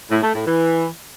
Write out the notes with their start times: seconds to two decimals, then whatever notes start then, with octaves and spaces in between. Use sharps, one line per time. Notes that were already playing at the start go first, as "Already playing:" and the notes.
0.11 A2
0.23 A3
0.35 A2
0.46 E3